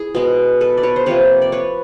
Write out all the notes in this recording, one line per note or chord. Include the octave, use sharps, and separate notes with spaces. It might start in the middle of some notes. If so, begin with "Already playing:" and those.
Already playing: E4 G#4
B2 G#3 B3
A4 B4
D5
B4 C#5
C5
C3 F3 A#3 B4 C#5
D5
B4 C#5